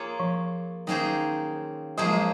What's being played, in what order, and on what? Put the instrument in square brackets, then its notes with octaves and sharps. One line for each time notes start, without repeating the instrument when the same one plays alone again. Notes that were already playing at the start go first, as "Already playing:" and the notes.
Already playing: [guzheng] A#3 F4 G#4 C#5
[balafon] F3
[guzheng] D#3 A#3 C#4 G#4 C5 [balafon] F#3
[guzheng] F3 A#3 C#4 G#4 C5 [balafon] F#3
[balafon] G#3
F#3